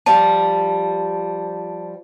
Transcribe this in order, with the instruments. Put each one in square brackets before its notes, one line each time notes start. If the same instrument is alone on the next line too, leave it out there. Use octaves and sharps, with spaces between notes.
[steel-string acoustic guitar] F3 G3 [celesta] A5